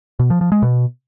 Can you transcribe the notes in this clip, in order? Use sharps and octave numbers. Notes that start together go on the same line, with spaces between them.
B2
F3
F3
G#3
B2